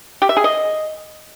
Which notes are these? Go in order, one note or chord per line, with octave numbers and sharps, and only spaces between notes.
G4
E5
G#4
D#5